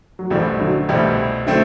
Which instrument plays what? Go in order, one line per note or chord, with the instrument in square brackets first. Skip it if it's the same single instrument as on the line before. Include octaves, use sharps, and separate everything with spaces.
[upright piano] F#3
[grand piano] C2 B2 A3 C4 E4 [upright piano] E3 G3
[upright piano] D3 F#3
[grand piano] C2 B2 A3 C4 E4 [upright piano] E3 G3
[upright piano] D3 F#3 [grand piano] A3 C4 E4